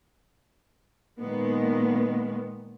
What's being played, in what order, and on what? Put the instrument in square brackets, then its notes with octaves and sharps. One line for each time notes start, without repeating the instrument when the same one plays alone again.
[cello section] A#2 D#3 G#3 B3